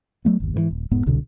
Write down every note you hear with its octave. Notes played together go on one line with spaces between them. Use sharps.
F#3 A3 B3
G1 D#2
G#2 C#3 E3
D#1
E1 G#2 B3
E1 C2 B2 D3